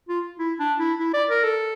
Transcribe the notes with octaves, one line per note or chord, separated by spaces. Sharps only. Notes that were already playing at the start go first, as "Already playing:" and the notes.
F4
E4
D4
E4
E4
D5
A#4
A4